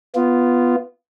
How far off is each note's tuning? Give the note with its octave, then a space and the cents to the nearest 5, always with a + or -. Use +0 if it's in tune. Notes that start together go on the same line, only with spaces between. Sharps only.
B3 +0 F4 -10